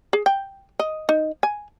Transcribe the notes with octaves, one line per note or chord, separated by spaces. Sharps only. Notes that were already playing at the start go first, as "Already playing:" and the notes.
G#4
G5
D#5
D#4
G#5